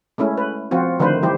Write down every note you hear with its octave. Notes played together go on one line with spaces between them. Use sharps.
G#3 A3 C#4 E4
B4
F3 C4 F4 F#4
D3 D#3 F3 A3 B4 C5
E3 G3 E4 G4 C5